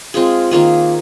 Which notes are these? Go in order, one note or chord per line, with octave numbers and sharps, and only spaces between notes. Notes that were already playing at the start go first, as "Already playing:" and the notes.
G#3 C4 F4 G#4
D#3 A#3 F4 G#4